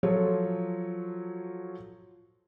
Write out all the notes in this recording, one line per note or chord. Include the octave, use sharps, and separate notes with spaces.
F3 F#3 F4 A4 C#5